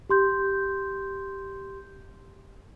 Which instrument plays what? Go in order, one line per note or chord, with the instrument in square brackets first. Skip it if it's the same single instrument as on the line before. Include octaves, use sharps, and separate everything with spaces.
[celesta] G4 C6 G6